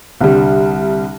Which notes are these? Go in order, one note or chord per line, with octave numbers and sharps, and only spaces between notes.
C2 D3 G3